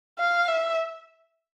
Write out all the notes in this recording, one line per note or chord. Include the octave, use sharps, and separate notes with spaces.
F5
E5